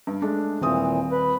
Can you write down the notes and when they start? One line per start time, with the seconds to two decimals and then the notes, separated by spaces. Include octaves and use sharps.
0.07 G2
0.22 G#3 A3 D4
0.61 D#1 A#2 E3 C4 D#6
1.11 B4